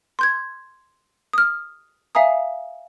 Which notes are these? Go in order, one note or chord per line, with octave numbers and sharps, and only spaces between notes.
C6 G6 G#6
D#6 F6
E5 F5 G#5 A#5 D#6